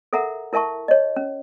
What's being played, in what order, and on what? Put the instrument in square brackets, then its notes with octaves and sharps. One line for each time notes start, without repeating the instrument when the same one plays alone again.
[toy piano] A4 A#4 E5 F#5 A#5
E4 A#4 E5 A5 C#6
C#5 D#5
C#4